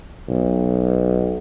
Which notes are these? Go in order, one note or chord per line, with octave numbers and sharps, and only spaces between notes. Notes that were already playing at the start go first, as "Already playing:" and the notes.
B1